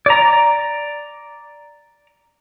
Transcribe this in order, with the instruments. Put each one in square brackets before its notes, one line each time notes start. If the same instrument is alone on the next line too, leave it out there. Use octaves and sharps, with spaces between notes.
[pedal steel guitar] D5 A#5